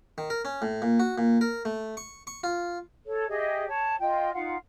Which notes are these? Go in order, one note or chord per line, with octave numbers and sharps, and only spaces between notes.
D#3
A#4
C#4
A2
A#2
F#4
A#2
A#4
A3
C#6
C#6
F4
A4 C#5
G4 G#4 D#5 E5
C#5 A5
F4 D#5 G5
D#4 F4 F5 F#5